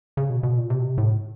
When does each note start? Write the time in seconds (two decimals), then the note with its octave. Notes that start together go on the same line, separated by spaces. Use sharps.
0.17 C#3
0.30 B2
0.43 B2
0.57 A#2
0.70 C3
0.79 B2
0.84 C3
0.98 A2